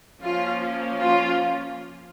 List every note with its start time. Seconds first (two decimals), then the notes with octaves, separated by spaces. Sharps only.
0.22 F3 A#3 C#4 F4
1.04 F4